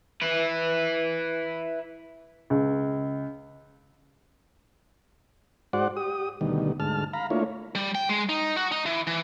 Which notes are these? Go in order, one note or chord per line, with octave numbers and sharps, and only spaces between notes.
E4 B4
C#2
G#2 F#4 C5 D5 F#5
G4 D#6
D2 B2 D#3 G3
D2 G#2 A5 F6
F5 A#5 B5
A3 A#3 D4 E4 F4 C#5
G3
G5
G#3
D#4
F#4
D#4
E3
E3